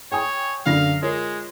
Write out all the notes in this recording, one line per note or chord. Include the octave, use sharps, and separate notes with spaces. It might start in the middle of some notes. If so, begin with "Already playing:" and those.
C#5 G5 G#5 D#6
F#2 D3 F5 A#6
G#3 F4 A#4 C#5